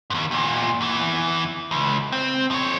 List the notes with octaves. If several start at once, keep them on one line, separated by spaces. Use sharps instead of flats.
D#2 G#2
E2 A#2
E2 E3
C#2
C4
F3 C#5